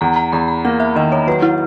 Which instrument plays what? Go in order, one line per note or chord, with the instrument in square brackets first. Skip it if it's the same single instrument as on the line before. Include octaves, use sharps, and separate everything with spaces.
[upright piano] E2 [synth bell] A#5
[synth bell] A#5
[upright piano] E2 [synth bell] B5
[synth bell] A#5
[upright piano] A#3 [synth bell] F#5
[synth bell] E5
[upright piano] D#3 [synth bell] D#5
[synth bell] C#5
[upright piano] F#3 [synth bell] B4
[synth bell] E4